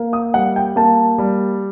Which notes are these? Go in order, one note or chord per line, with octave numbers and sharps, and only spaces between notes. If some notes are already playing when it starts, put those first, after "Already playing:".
Already playing: A#3
D#6
G3 F#5
G5
A#3 A5
G3